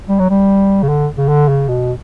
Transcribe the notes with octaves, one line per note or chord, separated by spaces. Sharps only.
G3
F#3
G3
C#3
D3
C#3
D3
C#3
B2